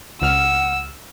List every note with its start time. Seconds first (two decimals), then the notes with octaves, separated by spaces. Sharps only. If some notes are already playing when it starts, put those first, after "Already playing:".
0.22 C#2 F#5 E6 F6